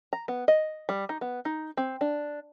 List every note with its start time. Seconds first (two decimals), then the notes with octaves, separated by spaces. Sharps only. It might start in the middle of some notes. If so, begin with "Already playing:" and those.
0.13 A#5
0.28 B3
0.48 D#5
0.89 G3
1.09 D#4
1.21 B3
1.45 D#4
1.77 C4
2.01 D4